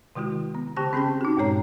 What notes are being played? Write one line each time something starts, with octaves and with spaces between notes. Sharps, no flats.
C3 D#3 G#3 E4 F#4
B3
C#3 G4 G5 A5 A#6
C4 C#4 G#4 G5 A5
D#4 F#4
G2 A#2 G#3 C#5 A#5